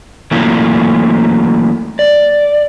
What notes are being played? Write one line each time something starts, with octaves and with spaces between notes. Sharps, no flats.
E3 F#3 A3 A#3 E4 F4
D5